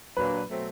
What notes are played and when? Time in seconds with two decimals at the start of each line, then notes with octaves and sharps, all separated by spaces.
0.17 A#2 F#3 A#3 D4 B4
0.50 B2 F#3 A3 C4